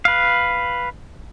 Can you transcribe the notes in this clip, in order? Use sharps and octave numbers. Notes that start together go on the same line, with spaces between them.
B4 F5